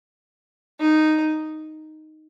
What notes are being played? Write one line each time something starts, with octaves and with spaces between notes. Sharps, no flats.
D#4